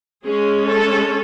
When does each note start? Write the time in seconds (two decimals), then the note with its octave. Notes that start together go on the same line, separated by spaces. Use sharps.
0.24 G#3 C#4 G#4
0.67 A4